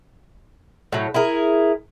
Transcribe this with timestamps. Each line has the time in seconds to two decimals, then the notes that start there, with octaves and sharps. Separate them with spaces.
0.92 A2 F#3
1.14 E4 G#4 A#4